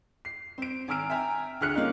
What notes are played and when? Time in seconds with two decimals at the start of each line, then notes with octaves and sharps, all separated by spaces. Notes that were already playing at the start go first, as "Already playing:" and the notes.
0.25 C7
0.58 C4 D7
0.88 G#1 G#5 A#5 E6 F6 D7
1.10 E5 G5 G#5 A#5
1.61 D2 G#4 F6 F#6 C#7
1.74 A#3 C#4 D#4 F4